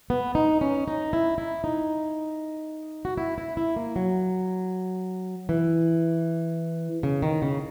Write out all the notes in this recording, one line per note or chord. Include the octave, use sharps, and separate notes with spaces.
B3
D#4
C#4
D#4
E4
E4
D#4
F#4
E4
E4
E4
A#3
F#3
E3
C#3
D#3
C#3